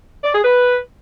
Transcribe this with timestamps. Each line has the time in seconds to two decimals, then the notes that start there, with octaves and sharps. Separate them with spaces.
0.23 D5
0.33 G#4
0.42 B4